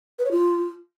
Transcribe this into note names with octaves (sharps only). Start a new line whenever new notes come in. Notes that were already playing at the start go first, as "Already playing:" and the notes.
B4
C#5
F4